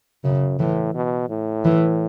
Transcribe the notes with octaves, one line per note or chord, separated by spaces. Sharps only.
F#2 C#3
A2 E3
B2
A2
E3